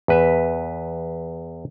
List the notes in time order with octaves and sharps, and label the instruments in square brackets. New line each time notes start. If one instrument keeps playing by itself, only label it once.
[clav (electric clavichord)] E2 B4 E5